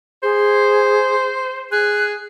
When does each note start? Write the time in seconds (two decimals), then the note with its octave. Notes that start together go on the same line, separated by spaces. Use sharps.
0.23 G#4 C5
1.72 G#4 F#6